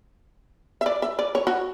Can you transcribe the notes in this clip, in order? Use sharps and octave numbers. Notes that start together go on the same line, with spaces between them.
E5
D5
E5
D5
C#5
F#4